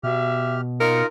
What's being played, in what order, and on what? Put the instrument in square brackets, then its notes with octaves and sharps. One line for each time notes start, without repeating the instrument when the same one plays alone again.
[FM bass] B2 [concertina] G4 F6 [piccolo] E5
[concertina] D#4 F4 D#5 [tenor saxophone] A#4 [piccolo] C#7